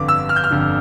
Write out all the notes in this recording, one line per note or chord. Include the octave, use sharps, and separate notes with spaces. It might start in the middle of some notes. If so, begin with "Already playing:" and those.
Already playing: G1 F2 D3 D6
E6
F6
G6
F6
G1 F2 D3